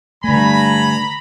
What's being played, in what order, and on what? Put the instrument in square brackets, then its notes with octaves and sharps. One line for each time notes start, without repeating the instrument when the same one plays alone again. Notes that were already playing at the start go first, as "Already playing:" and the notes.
[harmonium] G2 G3 G#5 [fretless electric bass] D3 A3 [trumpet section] A#5 B5